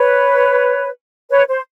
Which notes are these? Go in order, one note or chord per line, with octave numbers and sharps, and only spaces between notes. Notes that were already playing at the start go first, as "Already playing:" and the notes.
Already playing: B4 C#5
B4 C#5
C5